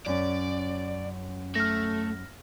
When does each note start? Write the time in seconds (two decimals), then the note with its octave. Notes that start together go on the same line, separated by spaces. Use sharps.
0.06 F#2 C#4 D5
1.55 A3 F6 A#6